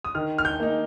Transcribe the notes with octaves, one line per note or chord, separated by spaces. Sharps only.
D#6
D#3 F6
F6
G6
A#3 D#4